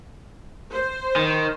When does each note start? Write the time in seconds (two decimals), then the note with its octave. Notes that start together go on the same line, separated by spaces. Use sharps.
0.72 C5
1.16 D#3